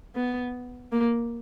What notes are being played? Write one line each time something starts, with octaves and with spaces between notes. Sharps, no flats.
B3
A#3